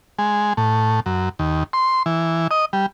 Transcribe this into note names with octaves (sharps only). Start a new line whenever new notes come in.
G#3
A2
F#2
D#2
C6
E3
D#5
G3